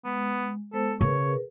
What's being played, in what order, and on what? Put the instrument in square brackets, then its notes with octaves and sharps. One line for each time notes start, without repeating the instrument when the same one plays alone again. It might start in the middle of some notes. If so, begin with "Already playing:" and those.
[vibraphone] G#3 [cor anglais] B3
[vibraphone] G#3 B3 C5 [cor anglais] A4
[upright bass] C#3 [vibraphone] G#4 A#4 B4 [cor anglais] C#5